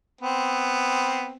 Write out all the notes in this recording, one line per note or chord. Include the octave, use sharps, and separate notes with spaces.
B3 C4